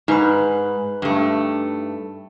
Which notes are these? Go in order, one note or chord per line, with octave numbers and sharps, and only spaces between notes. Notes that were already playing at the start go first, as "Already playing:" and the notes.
G#2 D#4 B4 B5
G2 A3